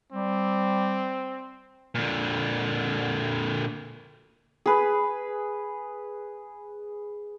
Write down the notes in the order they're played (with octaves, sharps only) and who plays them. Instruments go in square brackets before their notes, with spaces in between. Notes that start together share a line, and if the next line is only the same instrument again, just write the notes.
[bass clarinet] G3 [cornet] C4
[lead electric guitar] A#2 D3
[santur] G#4 B4